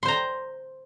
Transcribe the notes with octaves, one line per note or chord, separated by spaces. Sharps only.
C5 A#5 C6